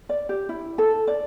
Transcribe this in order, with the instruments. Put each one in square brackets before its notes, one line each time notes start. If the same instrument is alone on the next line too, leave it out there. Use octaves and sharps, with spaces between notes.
[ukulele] D5
G4
E4
A4
D5